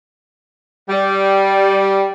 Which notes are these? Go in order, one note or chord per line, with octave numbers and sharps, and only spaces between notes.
G3